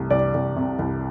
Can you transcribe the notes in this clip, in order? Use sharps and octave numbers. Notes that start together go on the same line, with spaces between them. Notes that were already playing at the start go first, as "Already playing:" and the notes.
Already playing: C2 A3
C2 D5
C2
C3
C2